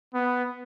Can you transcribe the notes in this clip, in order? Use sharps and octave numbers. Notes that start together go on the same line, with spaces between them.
B3